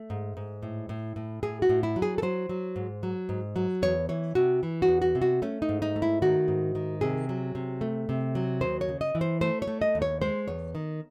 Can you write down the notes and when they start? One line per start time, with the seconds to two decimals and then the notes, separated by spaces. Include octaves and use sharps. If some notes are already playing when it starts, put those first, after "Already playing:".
Already playing: A3
0.10 G#2
0.37 G#2
0.63 A2
0.89 A2
1.16 A2
1.43 A2 G#4
1.62 F#4
1.69 A2
1.83 E4
1.96 F#3
2.02 G#4
2.18 A4
2.22 F#3 C5
2.49 F#3
2.76 G#2
3.03 F#3
3.29 G#2
3.56 F#3
3.82 E2 C#5
4.09 E3 C#5
4.35 C3 F#4
4.63 E3
4.82 F#4
4.88 E2
5.02 F#4
5.15 C3
5.22 F#4
5.42 A3 C#4
5.62 D#4
5.69 G#2
5.82 D#4
5.96 A3
6.02 E4
6.22 D#3 F#4
6.48 G#2
6.75 D#3
7.01 C3 G#4
7.29 F#3
7.55 C3
7.81 A3
8.09 C3
8.35 F#3
8.61 D#2 C5
8.81 C#5
8.88 C#3
9.01 D#5
9.15 E3
9.21 C5
9.41 A3 C5
9.62 C#5
9.67 A3
9.82 D#5
9.95 D#2
10.02 C#5
10.21 G#3 C5
10.48 E2 C#5
10.75 D#3